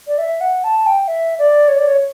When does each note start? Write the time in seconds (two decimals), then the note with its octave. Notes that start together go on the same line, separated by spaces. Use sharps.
0.07 D5
0.18 E5
0.41 F#5
0.64 A5
0.87 G5
1.08 E5
1.39 D5
1.68 C#5
1.79 D5
1.87 C#5